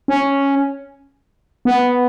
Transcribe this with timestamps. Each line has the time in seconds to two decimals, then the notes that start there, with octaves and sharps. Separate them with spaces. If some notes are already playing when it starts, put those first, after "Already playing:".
0.08 C#4
1.65 B3